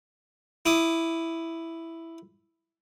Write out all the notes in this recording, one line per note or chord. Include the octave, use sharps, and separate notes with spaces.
E4 D6 D#6